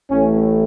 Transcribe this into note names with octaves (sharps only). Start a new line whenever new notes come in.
A1 A2 A3 C#4